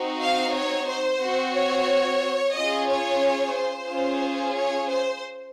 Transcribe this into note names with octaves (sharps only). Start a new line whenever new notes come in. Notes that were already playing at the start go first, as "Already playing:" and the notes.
Already playing: C4 D#4 F#4
F5
C#5
C5
C4 F#4
C#5
C#4 F4 G#4 D#5
C#5
C5
C#4 F4 G#4
C#5
C5